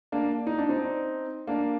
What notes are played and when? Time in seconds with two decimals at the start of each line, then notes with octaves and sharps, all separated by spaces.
0.12 A#3 D4
0.47 D#4
0.58 D4
0.69 C4 D#4
1.47 A#3 D4